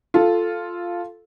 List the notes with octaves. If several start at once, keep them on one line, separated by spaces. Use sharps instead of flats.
F4 A4